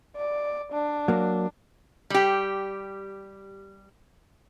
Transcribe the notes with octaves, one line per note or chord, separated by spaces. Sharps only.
D5
D4
F#3 A#3
G3 G4